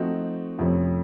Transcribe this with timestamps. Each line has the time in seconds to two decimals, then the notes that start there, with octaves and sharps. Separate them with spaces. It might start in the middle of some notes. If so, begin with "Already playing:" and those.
Already playing: F3 A3 C4 D#4 F#4
0.59 F2 C3 F3 A3 C#4